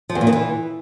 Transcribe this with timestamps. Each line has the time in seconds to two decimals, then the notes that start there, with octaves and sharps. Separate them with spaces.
0.09 F3
0.15 E2
0.21 A#2
0.27 D#3
0.33 E3